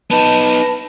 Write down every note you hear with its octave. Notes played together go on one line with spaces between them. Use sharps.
B3 D#4 B4 A5